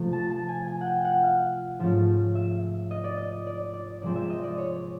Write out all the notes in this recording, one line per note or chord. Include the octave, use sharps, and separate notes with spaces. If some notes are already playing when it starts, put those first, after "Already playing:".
Already playing: C3 F3 A3
A5
A5
G#5
G#5
F#5
G5
F#5
F5
G#2 F3 A3 C#4
E5
D#5
D5
D#5
D5
D5
C3 F3 G#3 C4 D5
E5
D#5
D5
C#5